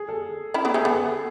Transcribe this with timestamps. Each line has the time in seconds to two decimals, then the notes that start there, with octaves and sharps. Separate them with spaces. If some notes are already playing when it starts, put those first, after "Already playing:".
Already playing: G#4
0.09 A4
0.54 C#4 E4
0.65 B3 D4
0.74 A3 C#4 G#4
0.85 B3 A4